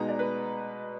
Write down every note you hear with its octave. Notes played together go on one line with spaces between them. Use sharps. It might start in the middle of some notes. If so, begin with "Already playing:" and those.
Already playing: B2 G#3 B3 D#4 A#5
D5
B4